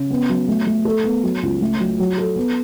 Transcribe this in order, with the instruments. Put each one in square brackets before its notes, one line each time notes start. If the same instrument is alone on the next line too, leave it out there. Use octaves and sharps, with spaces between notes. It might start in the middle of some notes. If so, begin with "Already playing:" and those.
Already playing: [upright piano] C#3
B3
F#3
A3
A3
A4
B3
F#3
C#2
A3
F#3
F#3
A4
B3